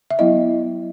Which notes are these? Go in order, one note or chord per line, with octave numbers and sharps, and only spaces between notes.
E5
F#3 B3 E4 D#5